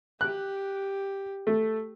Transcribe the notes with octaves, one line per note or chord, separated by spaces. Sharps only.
G4 F#6
A3